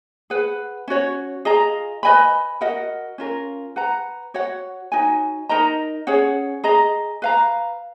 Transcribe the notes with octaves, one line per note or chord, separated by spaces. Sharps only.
G#4 B4 F#5
C#4 F#4 C#5
F4 G#4 D#5 A#5
B4 D#5 G#5 B5
F#4 A#4 D#5 F#5
C#4 F4 A#4
B4 F#5 A#5
F#4 C#5 F#5
D#4 F#4 C#5 G#5
D#4 A#4 D#5 A#5
C#4 G#4 C#5 F#5
G#4 D#5 A#5
B4 F5 A#5